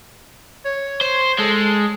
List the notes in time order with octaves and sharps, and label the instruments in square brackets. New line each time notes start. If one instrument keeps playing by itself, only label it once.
[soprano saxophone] C#5
[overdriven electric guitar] C5
[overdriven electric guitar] G#3 [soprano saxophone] A4